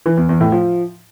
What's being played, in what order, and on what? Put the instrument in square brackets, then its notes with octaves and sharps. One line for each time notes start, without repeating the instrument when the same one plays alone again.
[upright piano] E3
E2
E2
A2
F3